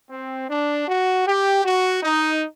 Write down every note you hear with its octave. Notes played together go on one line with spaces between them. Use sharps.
C4
D4
F#4
G4
F#4
D#4